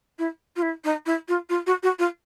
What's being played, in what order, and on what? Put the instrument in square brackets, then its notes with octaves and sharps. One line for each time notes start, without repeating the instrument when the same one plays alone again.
[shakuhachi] E4
F4
E4
D#4
E4
F4
F4
F#4
F#4
F4